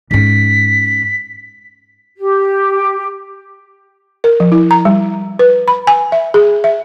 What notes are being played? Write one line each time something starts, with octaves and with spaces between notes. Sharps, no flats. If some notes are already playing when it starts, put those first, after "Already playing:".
G#2 C#4 B6
G4
A#4
F3
E4
A#5
G3
B4
B5
G#5
E5
G#4
E5